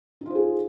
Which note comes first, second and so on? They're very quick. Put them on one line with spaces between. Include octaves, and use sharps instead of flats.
D#4 F4 C5 G#4